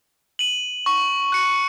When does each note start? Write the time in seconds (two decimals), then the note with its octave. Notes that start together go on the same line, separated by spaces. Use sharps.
0.39 D#7 F#7
0.86 C#6
1.32 F#6 C#7 F#7